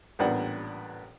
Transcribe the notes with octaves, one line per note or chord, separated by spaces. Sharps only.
A1 A#2 G3 B3 D4 F#5